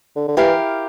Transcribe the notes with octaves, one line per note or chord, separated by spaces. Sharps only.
D3
D3
E3 E4 G4 A#4 F5